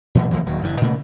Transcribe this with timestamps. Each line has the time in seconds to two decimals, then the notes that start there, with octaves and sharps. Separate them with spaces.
0.15 A#2 E3 F#3 A3
0.31 C#2 E3 F#3 A#3
0.46 D1 D#2 F#3
0.62 F#1 G2 E3
0.81 A#2 C#3 A3 A#3